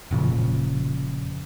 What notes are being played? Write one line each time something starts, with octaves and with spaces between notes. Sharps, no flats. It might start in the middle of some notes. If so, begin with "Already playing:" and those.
F1 A#2 C#3 F3